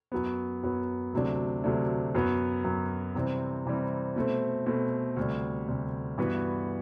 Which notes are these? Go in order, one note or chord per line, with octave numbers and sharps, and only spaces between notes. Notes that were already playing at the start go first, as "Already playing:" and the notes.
F#2 F#3 B3
F#2 F#3 B3
D2 C3 F#3 A3 D4
D2 C3 F#3 A3 D4
F#2 F#3 B3
F#2 F#3 B3
C3 E3 G3 C4
C3 E3 G3 C4
B2 A3 C4
B2 A3 C4
D2 C3 G3
D2 C3 G3
G2 E3 B3 F#4 B4